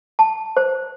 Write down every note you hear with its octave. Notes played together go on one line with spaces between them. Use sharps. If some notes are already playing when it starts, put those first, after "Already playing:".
A5
C5